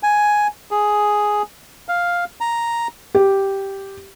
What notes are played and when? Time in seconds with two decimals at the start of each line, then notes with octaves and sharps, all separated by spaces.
0.03 G#5
0.71 G#4
1.89 F5
2.41 A#5
3.15 G4